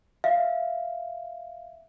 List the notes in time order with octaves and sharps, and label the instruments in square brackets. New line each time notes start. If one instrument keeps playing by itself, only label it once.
[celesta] E5 F5